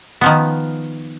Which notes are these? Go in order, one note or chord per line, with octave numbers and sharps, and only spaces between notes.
D#3 F3 B3